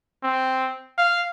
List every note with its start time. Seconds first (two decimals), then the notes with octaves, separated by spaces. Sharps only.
0.23 C4
0.98 F5